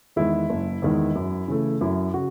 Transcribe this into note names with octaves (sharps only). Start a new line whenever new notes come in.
E2 D#3 G#3 E4
F#1
E2 D#3 G#3
F#2
C#3 E3 A3
F#2 E4
C#3 F#4